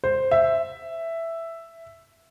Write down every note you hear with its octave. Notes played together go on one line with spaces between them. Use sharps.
C5
E5